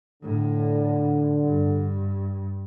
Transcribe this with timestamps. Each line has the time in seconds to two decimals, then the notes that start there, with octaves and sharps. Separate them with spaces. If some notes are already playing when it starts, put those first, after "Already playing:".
0.23 A2 D3
1.43 G2